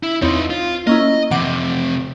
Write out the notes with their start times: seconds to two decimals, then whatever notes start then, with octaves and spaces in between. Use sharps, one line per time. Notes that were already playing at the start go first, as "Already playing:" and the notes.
0.03 E4
0.22 E2 C4 D#4 F4 C#5
0.50 F4
0.87 A#3 C#4 E4 D#5
1.31 F2 C3 E3 F#5 D6